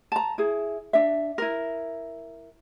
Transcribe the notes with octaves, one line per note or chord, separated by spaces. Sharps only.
A5 A#5
E4 G#4
D4 E5
E4 A#4